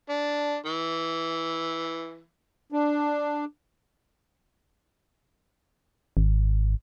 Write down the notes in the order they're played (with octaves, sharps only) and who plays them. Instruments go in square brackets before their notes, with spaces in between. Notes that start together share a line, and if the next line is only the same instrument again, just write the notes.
[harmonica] D4
E3
[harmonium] D4
[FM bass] G#1